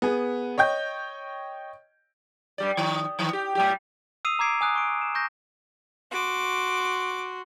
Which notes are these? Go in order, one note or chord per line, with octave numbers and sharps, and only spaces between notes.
B3 G#4
C#5 D#5 G5 G6
G2 G3 D5
D#3
D#3 E3
G4
A2 G3 G4
D#6 E6 C7 D#7 F7
A#5 D6 G#6 C7 D7
G#5 D#6 F#6
C#6 D7
E7
C#6 G6 A#6
F#4 C6 D6